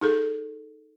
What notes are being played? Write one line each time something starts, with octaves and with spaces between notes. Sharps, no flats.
D#4 G#4 A4